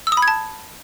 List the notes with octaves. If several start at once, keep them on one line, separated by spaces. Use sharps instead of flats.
E6
D#6
B5
G#6
A5